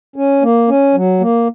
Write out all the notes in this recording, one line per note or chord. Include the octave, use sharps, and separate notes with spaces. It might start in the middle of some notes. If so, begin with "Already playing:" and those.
C#4
A#3
C#4
F#3
A#3